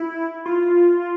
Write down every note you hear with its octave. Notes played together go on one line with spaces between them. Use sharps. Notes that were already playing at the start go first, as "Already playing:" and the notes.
Already playing: E4
F4